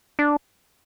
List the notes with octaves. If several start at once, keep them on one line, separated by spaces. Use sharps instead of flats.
D4